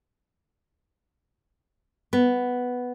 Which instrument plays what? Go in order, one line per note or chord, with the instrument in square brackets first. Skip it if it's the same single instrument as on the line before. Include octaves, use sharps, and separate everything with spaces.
[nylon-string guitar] B3